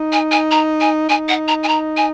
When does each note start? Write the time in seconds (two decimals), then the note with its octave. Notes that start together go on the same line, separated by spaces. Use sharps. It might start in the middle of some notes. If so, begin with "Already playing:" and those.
Already playing: D#4
0.12 G#5
0.32 G#5
0.51 A#5
0.81 G#5
1.09 D#4 G#5
1.29 F#5
1.48 A#5
1.63 G#5
1.68 A#5
1.97 G#5